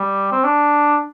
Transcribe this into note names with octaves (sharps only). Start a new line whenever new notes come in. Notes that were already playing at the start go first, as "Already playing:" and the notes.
Already playing: G3
C4
D4